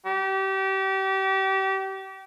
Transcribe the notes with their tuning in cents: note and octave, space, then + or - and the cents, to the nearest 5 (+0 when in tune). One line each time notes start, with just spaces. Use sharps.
G4 -30